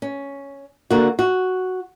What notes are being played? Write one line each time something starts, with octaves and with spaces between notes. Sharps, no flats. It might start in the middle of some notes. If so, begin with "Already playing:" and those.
C#4
D3 A#3 F#4
F#4